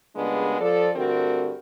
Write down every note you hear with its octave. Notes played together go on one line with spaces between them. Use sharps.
A#2 C#3 G3 G#3 B3 D4
F3 A4 D5
G2 D3 A3 C4 F#4 A#4